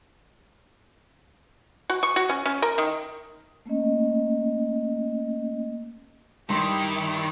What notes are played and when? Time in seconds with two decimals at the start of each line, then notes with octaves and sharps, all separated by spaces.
1.90 F#4
2.03 C#6
2.16 F#4
2.29 C#4
2.46 C#4
2.62 A#4
2.78 D#3
3.65 A3 A#3 C#4 D#5
6.50 G2 D#3 E4 G4 C6